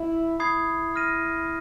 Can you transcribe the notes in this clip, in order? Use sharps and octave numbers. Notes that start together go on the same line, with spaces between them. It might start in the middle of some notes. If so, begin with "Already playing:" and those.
Already playing: E4
E4 B5 D#6 G#6 C7
F6 A#6 D#7